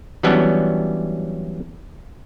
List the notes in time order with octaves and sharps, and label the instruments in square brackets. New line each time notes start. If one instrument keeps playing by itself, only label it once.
[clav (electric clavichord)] E3 F#3 G3 B3 C#4 D4